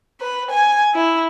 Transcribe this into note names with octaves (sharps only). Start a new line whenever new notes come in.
B4
G#5
E4